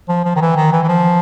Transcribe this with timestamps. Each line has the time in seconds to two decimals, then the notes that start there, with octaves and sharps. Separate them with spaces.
0.09 F3
0.25 F3
0.36 D#3
0.41 E3
0.56 D#3
0.72 E3
0.83 E3
0.89 F3